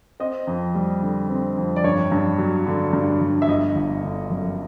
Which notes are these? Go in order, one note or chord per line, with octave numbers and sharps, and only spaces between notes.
C4 D#5
F2
G3
D3
C4
F2
D5
G2 C#5
G2
F#3
D3
G2
G2
E5
G1 D#5
G1
D3
F#2